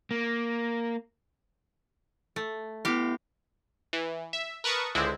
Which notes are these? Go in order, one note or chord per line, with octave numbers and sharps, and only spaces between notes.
A#3
A3
B3 E4 G4 F5
E3
E5
A#4 B4 A5 C#6 D#6
C#2 D3 G#3 C4 E4